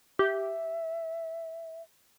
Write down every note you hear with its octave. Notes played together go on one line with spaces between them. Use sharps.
G4 E5